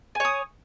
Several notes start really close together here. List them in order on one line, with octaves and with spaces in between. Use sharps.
G#5 C#5 D#6